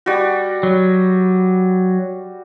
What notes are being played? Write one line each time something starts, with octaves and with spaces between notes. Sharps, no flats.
G3 F#4
F#3